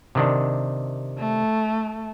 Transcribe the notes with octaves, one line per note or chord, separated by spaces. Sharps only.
C3 D#3 D4
A3